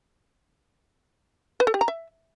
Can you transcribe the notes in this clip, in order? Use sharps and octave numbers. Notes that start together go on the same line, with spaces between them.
B4
A4
G4
A#5
E5